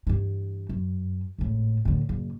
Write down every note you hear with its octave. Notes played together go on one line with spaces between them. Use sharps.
G2 E3
F#2
G#1 A2
A2 D3
F#1